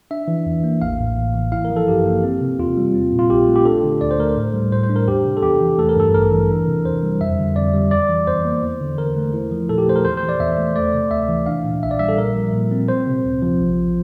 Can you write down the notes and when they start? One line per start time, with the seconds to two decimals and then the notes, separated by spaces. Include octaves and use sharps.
0.11 D4 E5
0.28 E3
0.46 E2
0.64 A#3
0.82 A1 F5
1.00 A2
1.17 A1
1.34 E3
1.52 E4 F5
1.65 A#4
1.70 F3
1.76 A4
1.87 G2 G4
2.05 A#3
2.23 C4
2.42 C3
2.59 E2 F4
2.77 G3
2.94 C4
3.12 A#2
3.19 F4
3.30 A#1 G4
3.48 A3
3.56 G4
3.65 D4 A4
3.83 D3
4.01 D2 D5
4.11 C5
4.19 A3 A#4
4.29 C5
4.37 A2
4.54 G3
4.72 A2 C5
4.83 C5
4.90 D4
4.96 A#4
5.08 E2 G4
5.25 C3
5.37 A4
5.43 E2 G4
5.61 E3
5.79 A3 A4
5.89 A#4
5.96 G2 A4
6.14 A1 A#4
6.32 E3
6.50 D4
6.68 C3
6.85 E2 C5
7.03 G3
7.21 F2 E5
7.38 D3
7.56 F2 D5
7.74 G3
7.91 E2 D5
8.09 E3
8.27 E2 C5
8.45 A#3
8.63 E2
8.81 D3
8.98 E2 A#4
9.16 A3
9.33 E4
9.51 F3
9.69 A#2 A4
9.78 G4
9.87 A3 C5
9.96 A#4
10.05 E2 C5
10.17 C5
10.23 E3
10.29 D5
10.40 E2 E5
10.58 A3
10.76 A3 D5
10.94 C3
11.11 D2 E5
11.29 E3
11.46 D4 F5
11.65 A#2
11.83 A#1 E5
11.91 D5
11.99 G3 E5
12.08 A4
12.18 A#2 A#4
12.36 F3
12.53 A#2
12.71 C4
12.88 C4 C5
13.07 C3
13.24 D2
13.42 F3
13.60 A1